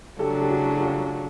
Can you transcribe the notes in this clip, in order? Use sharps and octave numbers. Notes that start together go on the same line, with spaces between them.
C#3 F#3 A3 D4 G4 A4
G4
F#4 G#4
F4 G4